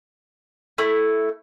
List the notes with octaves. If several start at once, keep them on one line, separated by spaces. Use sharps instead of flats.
A3 E4